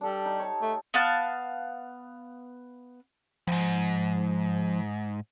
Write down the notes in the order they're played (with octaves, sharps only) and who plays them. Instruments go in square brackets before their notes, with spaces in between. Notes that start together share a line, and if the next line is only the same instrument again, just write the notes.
[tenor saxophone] G3 [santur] D4 A4
[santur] D#4 G4
C#5 A5
[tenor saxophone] A3
[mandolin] B3 F5 A5 F#6
[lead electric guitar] C2 G#2 [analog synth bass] F3